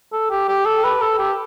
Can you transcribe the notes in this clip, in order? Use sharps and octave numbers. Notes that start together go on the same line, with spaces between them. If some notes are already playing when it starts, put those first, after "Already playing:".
A4
G4
G4
A4
B4
A4
G4